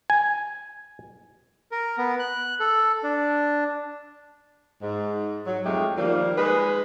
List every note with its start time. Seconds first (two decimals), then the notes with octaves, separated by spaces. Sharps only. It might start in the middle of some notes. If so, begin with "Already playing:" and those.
0.10 G#5
1.72 A#4
1.98 B3
2.19 F#6
2.60 A4
3.03 D4
4.82 G#2
5.46 F#3
5.65 F2 G#3 A3 D#4 G4
5.98 D#3 F3 G3 A#3
6.37 G#3 D#4 G#4 B4